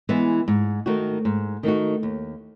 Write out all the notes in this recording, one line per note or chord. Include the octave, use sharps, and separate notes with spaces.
E3 G#3 B3 E4
G#2
D#3 A3 D#4 F#4
G#2
D#3 A3 D#4 F#4
D#2